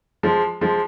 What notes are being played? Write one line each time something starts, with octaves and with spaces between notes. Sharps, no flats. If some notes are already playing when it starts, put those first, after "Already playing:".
F3 G#3
F3 G#3